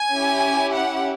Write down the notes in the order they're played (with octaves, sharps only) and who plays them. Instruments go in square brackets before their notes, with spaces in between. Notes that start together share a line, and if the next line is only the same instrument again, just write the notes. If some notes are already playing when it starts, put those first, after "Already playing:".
Already playing: [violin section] G#5
C#4 E4 G4
F#5